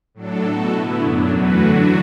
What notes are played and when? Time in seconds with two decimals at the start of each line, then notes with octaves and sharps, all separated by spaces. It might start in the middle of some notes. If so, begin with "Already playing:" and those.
0.14 A2 F#3 D4 A4
0.43 B2 A3 F#4 A4
0.72 D3 B3 E4 B4
1.01 F#2 F#3 D4
1.31 E2 E3 A3 F#4 B4
1.59 D3 F#3 D4 F#4 A4